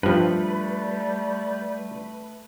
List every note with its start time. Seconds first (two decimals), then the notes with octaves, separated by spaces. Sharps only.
0.03 G2 F3 G3 A3 B4